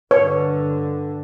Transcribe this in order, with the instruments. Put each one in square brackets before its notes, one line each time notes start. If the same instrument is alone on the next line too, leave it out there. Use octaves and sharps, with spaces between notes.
[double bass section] G2 D3 [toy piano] B4 [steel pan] C#5